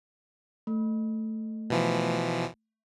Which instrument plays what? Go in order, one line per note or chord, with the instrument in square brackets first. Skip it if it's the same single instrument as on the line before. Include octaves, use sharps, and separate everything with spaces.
[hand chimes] A3
[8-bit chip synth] B2 E3 F3